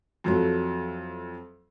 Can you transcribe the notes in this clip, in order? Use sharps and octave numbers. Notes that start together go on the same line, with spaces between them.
F2 F#3 A3